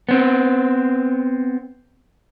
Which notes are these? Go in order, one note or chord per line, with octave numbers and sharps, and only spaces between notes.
B3 C4